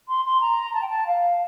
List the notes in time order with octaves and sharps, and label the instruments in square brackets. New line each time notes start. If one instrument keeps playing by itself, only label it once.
[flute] C6
C6
A#5
A5
G5
A5
F5